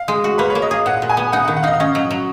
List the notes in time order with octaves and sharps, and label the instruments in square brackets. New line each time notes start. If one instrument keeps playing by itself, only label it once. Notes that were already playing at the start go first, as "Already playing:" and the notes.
Already playing: [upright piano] F5
[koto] G#3
F#4
[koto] A#3 [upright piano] B4
[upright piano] C#5
[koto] A#3
[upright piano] D#5
[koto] G#4 [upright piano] F5
[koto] A#2 [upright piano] F#5
[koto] A#2
[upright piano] G#5
[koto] B3
[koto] D#4 [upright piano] F#5
[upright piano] F#5
[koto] D#3
[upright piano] F#5
[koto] D#4 [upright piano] D#5 F5
[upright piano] F5
[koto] C#4 [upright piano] D#5
[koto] F#3
F#3